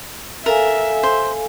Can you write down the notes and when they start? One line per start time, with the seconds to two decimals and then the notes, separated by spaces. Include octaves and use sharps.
0.46 A4 A#4 E5 F5 G#5
1.03 C5